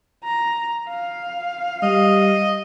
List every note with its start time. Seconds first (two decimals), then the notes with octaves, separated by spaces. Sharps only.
0.24 A#5
0.89 F5
1.83 G3 D#5